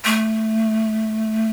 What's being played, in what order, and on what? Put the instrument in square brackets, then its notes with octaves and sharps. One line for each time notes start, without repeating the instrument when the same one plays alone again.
[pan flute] A3